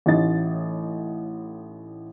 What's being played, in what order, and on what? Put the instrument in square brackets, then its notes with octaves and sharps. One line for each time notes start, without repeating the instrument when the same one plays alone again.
[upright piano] A1 A2 D#4 A6